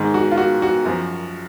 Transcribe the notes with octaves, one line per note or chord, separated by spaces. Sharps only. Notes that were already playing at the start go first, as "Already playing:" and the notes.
Already playing: G#2 D#3
F#4
F4
F#4
F#4
F#2 F3